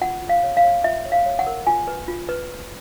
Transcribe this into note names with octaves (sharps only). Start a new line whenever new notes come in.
F4 F#5
F4
F5
C#5
F5
C#5
F4 E5
C#5
F5
C#5
F#5
A#4
F4 G#5
B4
F4
B4
B4